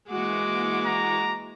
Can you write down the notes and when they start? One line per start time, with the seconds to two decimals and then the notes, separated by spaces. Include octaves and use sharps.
0.10 E3 G#3 A#3 F#4 D6
0.87 A#5